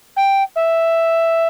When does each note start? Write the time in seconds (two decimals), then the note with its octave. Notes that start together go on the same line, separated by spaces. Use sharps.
0.16 G5
0.56 E5